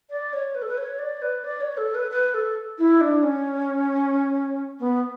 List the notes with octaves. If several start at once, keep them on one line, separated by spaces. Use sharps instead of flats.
D5
C#5
B4
A4
B4
C#5
D5
B4
D5
C#5
A4
B4
B4
A4
E4
D4
C#4
B3